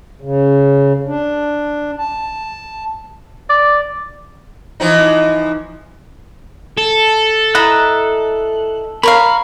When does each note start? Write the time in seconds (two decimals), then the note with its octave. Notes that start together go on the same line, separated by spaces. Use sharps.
0.21 C#3
1.07 D4
1.98 A5
3.50 D5
4.80 E3 F3 D#4
6.78 A4
7.55 E4 D#5 A#5 F#6
9.03 A#4 C#5 F5 B5